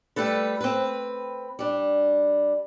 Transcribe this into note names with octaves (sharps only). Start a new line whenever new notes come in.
G3 A3 A4 B4
C4 B4
G3 D4